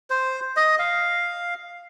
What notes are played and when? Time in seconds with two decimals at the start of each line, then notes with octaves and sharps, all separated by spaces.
0.10 C5
0.57 D#5
0.79 F5